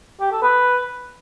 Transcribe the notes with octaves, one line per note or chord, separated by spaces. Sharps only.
G4
A4
B4